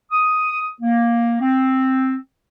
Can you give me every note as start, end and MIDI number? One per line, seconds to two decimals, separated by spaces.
0.11 0.66 87
0.81 1.36 58
1.41 2.15 60